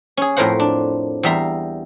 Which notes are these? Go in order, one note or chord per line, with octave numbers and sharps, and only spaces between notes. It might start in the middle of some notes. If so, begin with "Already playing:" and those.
C#4 G#4
F2 A2 F3 A#4 C5 F#5
D4
E2 G3 E5 A#5 C6